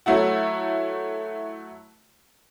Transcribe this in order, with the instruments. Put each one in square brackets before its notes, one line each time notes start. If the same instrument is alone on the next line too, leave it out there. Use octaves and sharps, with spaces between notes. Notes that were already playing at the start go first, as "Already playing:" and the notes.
[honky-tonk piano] F#3 A3 E4 F#4